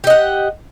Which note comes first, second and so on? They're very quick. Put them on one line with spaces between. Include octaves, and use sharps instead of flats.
G4 D#5 F#5